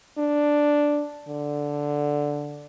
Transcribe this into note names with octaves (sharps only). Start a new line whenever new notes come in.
D4
D3